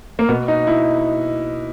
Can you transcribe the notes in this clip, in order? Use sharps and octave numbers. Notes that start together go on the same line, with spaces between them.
A#3
B2 B3
D#4
E4